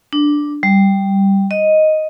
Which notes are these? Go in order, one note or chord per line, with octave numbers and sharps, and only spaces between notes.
D4
G3
D#5